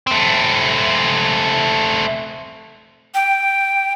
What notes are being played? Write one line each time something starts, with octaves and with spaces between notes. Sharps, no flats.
A3 C4
G5